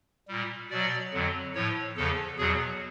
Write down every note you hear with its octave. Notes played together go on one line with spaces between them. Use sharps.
A#2 G3
B2 F#3 D5
F2 D3 F#3
A2 F3 C#5
E2 C#3 F3 A4
E2 B2 F#3 G#4